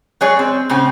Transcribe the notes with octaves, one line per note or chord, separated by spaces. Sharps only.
F#3 G#3 G#4 C#5 D5
C4
A2 C#3 C4